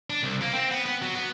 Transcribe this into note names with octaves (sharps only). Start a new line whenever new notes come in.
D4
C2
A#3
C4
B3
B3
F#3
B3